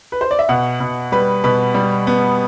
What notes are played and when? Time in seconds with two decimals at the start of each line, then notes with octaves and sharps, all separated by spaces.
0.12 B4
0.21 C5
0.31 D5
0.39 E5
0.49 B2 F#5
0.80 B2
1.12 G3 B4
1.44 B2 B4
1.74 G3
2.07 B3